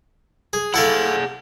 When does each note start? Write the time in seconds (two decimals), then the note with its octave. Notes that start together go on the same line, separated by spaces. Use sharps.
0.53 G#4
0.74 E4 G#4 A4 F5 F#5